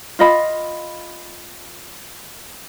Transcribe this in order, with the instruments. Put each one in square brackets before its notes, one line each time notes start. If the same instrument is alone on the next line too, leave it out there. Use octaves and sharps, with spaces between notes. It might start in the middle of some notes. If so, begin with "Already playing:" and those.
[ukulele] F4 D#5 B5